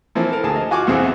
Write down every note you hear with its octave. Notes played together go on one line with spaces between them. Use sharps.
E3 F3 A#3 C4
A4 A#4
D2 G#4 A5
D#5
F4 F#4 G#5 C#6 D6
B1 E2 C3 C4 G#4 F#5